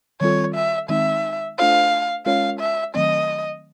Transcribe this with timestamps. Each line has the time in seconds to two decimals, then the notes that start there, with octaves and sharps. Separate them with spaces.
0.21 D#3 G3 C4 F4 A4 C#5
0.55 E5
0.89 D#3 G#3 C4 D#4 E5
1.58 A3 D4 F4 A4 C5 F5
2.26 G#3 C#4 F4 A#4 C#5 F5
2.60 E5
2.94 D#3 F#3 A3 C4 D#5